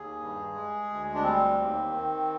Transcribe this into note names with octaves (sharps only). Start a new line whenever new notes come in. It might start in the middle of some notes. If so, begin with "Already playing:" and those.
Already playing: D#2 G#4
G2
G#3
D2
D4
G3 C4
D#2
D#3